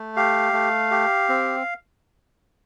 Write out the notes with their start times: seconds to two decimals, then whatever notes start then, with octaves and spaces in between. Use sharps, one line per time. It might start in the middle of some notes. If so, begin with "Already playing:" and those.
Already playing: A3
0.16 G4 F5
0.53 A3
0.91 G4
1.29 C4